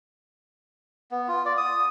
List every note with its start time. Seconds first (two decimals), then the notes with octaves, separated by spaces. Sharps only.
1.11 B3
1.28 F4
1.45 D5
1.57 D#6